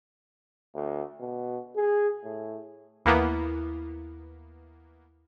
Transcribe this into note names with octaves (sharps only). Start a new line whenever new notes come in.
D2
B2
G#4
A2
D#2 E3 A#3 B3 E4